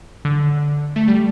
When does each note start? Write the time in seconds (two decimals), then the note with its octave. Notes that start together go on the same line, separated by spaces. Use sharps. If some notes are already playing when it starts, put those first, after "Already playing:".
0.25 D3
0.96 A3
1.08 G3